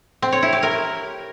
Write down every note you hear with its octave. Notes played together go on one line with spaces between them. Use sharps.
C4
C#5
E4
G4
A#4